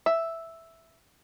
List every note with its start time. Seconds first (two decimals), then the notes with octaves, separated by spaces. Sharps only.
0.06 E5